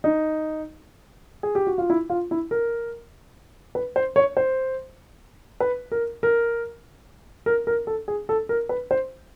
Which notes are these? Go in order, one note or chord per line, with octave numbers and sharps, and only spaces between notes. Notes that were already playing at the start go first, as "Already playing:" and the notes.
D#4
G#4
G4
F#4
F4
E4
F4
E4
A#4
B4
C5
C#5
C5
B4
A#4
A#4
A#4
A#4
A4
G#4
A4
A#4
B4
C5